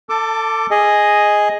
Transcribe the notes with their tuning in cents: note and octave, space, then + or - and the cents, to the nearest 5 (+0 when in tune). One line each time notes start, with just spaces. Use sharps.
A4 +25 A5 +0 D6 +0
G#4 +0 D#5 +0